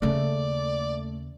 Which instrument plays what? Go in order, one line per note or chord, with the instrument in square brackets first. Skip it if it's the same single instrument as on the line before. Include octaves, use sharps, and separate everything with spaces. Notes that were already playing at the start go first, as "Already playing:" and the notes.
[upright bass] D#2 C#3 [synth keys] A3 [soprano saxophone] D5